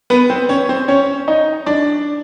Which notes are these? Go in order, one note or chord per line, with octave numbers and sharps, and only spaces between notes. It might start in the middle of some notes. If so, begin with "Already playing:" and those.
B3 B4
C4 C5
C#4 C#5
C4 C5
C#4 C#5
D#4 D#5
D4 D5